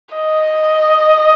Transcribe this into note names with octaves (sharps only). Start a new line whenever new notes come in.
D#5